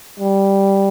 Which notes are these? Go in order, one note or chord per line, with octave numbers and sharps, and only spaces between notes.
G3